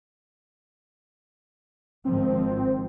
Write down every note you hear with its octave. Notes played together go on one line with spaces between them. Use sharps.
G#1 D#3 F3 C4